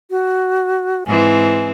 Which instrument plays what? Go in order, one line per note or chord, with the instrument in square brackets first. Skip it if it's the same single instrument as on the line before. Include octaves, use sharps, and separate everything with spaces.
[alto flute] F#4
[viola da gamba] G#2 E3 C4 [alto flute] G#5